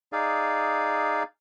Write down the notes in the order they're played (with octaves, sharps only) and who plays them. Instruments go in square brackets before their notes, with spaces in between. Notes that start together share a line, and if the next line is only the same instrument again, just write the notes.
[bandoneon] D#4 G#4 D5 F5